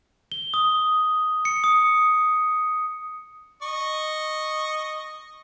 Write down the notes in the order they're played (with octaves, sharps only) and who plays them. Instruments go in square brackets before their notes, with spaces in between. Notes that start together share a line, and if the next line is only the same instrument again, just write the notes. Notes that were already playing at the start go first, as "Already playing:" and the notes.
[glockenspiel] G7
D#6
C#7
D#6
[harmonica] D#5 C#6